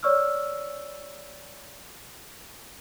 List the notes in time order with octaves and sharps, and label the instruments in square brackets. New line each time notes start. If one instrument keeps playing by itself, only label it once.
[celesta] C#5 D5 C#6 E6 F6